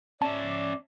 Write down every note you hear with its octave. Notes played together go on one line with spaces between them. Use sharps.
C#4 D5 E5 A5